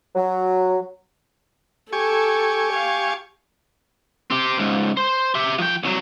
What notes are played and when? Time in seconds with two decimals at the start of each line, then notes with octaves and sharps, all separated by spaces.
0.16 F#3
1.93 G4 A4 G#5 C#6
2.73 F5
4.30 C4 G4
4.58 C#2 G#2
4.97 C5
5.35 G4 E5
5.58 F3 G5
5.83 C2 F#3